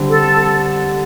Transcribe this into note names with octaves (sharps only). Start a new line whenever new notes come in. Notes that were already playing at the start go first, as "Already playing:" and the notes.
Already playing: D3 G3 C4
A4